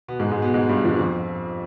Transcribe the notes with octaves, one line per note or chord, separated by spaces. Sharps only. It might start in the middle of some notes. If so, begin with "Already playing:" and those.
B2 B3
G#2 G#3
G#2 G#3
B2 B3
G#2 G#3
G2 G3
F2 F3
F2 F3